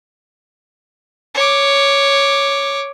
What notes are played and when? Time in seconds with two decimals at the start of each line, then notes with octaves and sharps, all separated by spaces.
1.35 C#5 D6